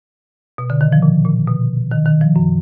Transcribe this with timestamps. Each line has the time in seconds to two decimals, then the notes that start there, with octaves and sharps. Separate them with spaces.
0.58 B2
0.70 D3
0.81 D#3
0.92 F3
1.02 A#2
1.25 A#2
1.47 B2
1.91 D#3
2.06 D#3
2.21 F3
2.36 F#2